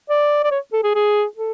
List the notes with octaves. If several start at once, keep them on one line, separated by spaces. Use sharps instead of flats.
D5
D5
C#5
A4
G#4
G#4
A4